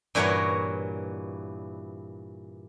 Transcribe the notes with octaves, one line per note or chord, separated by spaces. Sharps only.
G2 A#2 E3 F#4 A#4 C#5